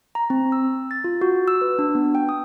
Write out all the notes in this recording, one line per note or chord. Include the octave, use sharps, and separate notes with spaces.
A#5
C4
E6
A6
F4
F#4
E6
B4
D4
B3
G5
D#6